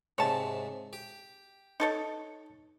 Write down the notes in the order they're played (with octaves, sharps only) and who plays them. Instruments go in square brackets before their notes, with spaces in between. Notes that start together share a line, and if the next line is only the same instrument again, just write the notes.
[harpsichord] G#2 C3 [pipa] C#5 A5
[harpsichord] G4
[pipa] D#4 A4 C#5